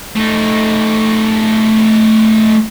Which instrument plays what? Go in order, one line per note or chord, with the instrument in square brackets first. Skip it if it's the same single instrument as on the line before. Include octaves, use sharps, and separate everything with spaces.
[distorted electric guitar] A3 D#4